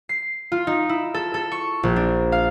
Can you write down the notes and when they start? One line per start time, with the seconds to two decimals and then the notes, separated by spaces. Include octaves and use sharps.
0.09 C7
0.52 F4
0.67 D#4
0.89 E4
1.14 A4
1.34 A4
1.52 C#6
1.83 A#1
1.96 D4
2.32 F5